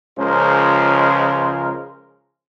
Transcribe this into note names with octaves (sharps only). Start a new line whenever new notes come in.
C#2 C#3 F3 G#3 A#4 C5